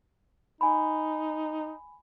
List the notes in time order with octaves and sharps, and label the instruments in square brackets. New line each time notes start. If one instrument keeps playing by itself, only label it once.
[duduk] D#4 [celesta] G#5 B5